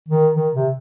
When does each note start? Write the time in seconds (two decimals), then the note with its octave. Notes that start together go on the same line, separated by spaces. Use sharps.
0.08 D#3
0.35 D#3
0.54 C3